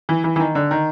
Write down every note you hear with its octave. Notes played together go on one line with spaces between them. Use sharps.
E3
E3
E3
D#3
D3
D#3